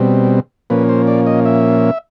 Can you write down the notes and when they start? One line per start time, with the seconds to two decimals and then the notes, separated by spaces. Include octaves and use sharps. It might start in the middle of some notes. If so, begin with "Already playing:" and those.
Already playing: B2 G3 C4
0.70 A#2 F3 A#3 C#4 B4
0.89 C5
1.07 D5
1.27 D#5
1.45 E5